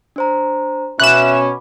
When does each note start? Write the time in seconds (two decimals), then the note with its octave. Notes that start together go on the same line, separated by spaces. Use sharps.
0.16 D4 C5 A#5
1.00 B2 C#4 E5 B5 D6 F#6 E7